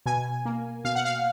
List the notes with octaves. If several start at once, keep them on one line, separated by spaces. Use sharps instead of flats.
B2 G#5
A#3
B2 F5
F#5
F5